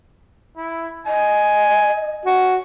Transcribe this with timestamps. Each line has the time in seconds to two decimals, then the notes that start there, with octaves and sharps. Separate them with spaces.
0.57 E4
1.07 D#5 G#5
2.25 C#4 F#4